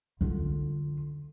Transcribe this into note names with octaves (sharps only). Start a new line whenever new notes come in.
D3 F4